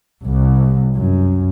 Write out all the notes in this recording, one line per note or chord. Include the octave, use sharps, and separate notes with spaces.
C2
F#2